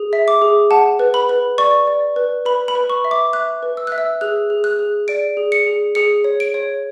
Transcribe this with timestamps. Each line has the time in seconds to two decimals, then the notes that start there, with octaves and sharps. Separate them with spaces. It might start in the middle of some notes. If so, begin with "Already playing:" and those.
Already playing: G#4
0.13 E5
0.28 D6
0.42 G#4
0.71 F#5 A5
0.99 B4
1.14 B5
1.29 B4
1.58 D5 C#6
1.87 D5
2.16 B4
2.46 B4 B5
2.68 B5
2.75 B4
2.90 C#6
3.05 E5
3.11 D6
3.33 E5 F#6
3.63 B4
3.77 E6
3.87 E5 F#6
3.98 E6
4.21 G#4 F#6
4.50 G#4
4.64 F#6
4.79 G#4
5.08 D5 D7
5.37 G#4
5.52 C#7
5.66 G#4
5.95 G#4 C#7
6.24 C#5
6.40 D7
6.54 C#5